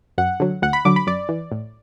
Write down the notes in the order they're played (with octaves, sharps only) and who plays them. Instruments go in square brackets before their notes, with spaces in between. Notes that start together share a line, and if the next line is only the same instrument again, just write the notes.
[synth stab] F#2 F#5
D3 F#3
D2 F#5
B5
D3 F#3 D6
B5
F#2 D5
E3
A2